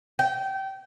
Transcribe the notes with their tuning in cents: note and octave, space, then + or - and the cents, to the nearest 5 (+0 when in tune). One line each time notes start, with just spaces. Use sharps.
G5 -25